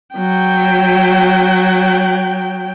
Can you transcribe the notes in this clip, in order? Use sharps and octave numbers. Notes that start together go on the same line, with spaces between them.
F#3 G5